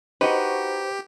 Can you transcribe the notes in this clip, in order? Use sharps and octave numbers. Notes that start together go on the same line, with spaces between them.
D#4 F#4 G4 B4 C5 D#5